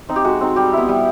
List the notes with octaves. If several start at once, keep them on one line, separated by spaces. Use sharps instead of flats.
C4 D#4
G4
G#3 F#4
C4 D#4
G3 G4
B3 E4
G3